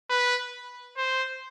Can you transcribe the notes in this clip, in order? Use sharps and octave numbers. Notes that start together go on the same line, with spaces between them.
B4
C5